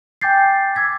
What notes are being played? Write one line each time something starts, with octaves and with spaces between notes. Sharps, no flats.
G5 G#5 D6 G6 A6 C7
D6 E6 G#6 B6